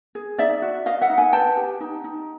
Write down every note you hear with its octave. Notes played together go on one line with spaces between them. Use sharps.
G#4
D#4 D5 E5
F#4
F#4 D#5 F5
E5 F#5
D#4
F#5 G#5
B4 G5 A5
G4
D#4
D#4